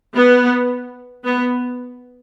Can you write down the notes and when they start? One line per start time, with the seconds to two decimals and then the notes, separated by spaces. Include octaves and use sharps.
0.15 B3
1.25 B3